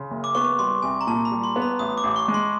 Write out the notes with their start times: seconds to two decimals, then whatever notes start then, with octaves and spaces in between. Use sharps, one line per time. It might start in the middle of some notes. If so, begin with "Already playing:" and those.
Already playing: C#3 C6
0.11 F#1
0.24 D6
0.35 B3 C#6
0.59 G3 C6
0.82 C2 G#5
1.01 A#5
1.07 A#2 A5
1.25 B5
1.31 G3
1.44 C6
1.56 B3
1.62 B5
1.79 A1 D#6
1.98 D6
2.03 A1
2.16 C#6
2.28 G#3
2.34 C6